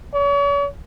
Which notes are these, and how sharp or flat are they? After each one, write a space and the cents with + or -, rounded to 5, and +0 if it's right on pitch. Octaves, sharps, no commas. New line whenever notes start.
C#5 +40